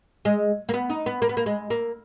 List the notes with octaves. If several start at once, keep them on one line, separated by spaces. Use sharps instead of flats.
G#3
A#3
B3
D#4
B3
A#3
B3
A#3
G#3
A#3